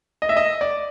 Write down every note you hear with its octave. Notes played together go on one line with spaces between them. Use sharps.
D#5
E5
D#5
D5